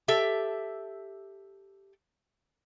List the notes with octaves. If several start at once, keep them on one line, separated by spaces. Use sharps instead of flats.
G4 A4 E5